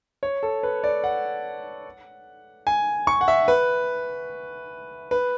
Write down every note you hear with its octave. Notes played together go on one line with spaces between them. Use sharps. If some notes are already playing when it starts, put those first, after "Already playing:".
C#5
A4
B4
D5
F#5
G#5
C#6
F#5
E5
B4
B4